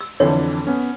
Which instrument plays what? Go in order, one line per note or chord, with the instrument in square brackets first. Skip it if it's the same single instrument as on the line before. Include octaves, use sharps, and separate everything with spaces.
[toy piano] E6
[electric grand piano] F2 D3 E3 [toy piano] C#5
[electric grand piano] B3 C#4